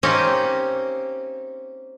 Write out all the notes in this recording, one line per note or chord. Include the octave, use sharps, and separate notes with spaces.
A#3 C4 C#4 D#4 G4